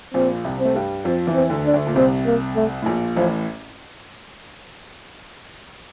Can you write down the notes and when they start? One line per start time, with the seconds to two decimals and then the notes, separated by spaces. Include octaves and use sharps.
0.14 A#1 A#2 C4
0.44 C2 C3
0.59 C4
0.65 A3
0.75 G2 G3
1.05 F2 F3 C4
1.27 E2 E3
1.34 C4
1.50 D2 D3
1.66 D4
1.73 D2 D3
1.87 A#2
1.96 C2 C3 C4
2.26 A#3
2.56 A3
2.82 A2
2.86 A#1 A#2
3.16 A1 A2 F3